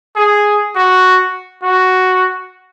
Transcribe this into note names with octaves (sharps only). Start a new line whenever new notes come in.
G#4
F#4
F#4